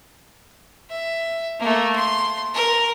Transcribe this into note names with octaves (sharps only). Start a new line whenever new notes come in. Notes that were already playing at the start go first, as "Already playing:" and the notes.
E5
A3 A#3
C6
A#4